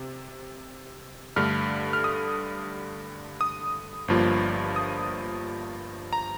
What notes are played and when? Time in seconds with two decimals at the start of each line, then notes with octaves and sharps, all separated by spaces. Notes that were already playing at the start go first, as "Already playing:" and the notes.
Already playing: C3
1.36 G2 D3 A3 F6
1.93 F6
2.04 D#6
3.41 D#6
4.08 G1 G2 F3 A#3 F4
4.76 D#6
6.13 A#5